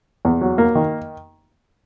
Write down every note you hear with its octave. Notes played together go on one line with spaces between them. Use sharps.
E2
F#3
A#3
D#3